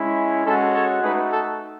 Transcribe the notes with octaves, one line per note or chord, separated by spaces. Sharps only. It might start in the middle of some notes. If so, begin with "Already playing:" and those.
Already playing: G#3 C#4 E4
G#3 C#4 F#4 A4
A4 C#5
A3 D#4 F#4 G#4 B4
A4